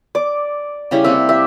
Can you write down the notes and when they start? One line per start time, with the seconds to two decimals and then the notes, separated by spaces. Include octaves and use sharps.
0.15 D5 D6
0.91 C#3 G3 E4
1.04 C3 A#3 C4 E5
1.29 G4 E5